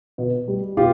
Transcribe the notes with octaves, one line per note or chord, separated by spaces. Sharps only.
B2
G3
B2 F4 G4